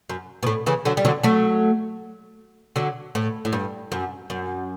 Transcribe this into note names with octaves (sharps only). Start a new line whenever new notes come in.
F#2
B2
A2
C#3 E3
D3 F#3
G3
D3 F#3
F#3 A3
D3 F#3
A2
A2
G2
F#2
F#2